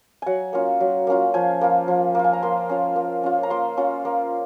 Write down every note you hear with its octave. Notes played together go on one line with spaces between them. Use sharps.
F#3 F#5 G#5
A#3 C#4 F4
F#3
A#3 C#4 F4
F3 G#5
A#3 F4
F3
A#3 F4
G#5
A#5
A#3 C6
C#4 F4
A#3
C#4 F4
A#5
A#3 C6
C#4 F4
A#3